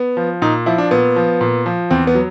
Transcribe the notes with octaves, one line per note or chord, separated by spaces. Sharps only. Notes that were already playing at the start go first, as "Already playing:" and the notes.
Already playing: B3
F3
A#2 D#4
F3 E4
D4
A#2 B3
F3
A#2
F3
E2 C4
B3
F#3